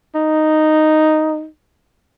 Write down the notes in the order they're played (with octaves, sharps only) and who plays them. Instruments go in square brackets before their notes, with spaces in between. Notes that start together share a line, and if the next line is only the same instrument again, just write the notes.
[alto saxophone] D#4